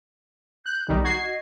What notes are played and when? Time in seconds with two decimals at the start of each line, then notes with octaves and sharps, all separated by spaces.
0.66 F#6 G6
0.88 B1 D#3 G3 D#4
1.04 F#4 G#6 C7
1.23 D#5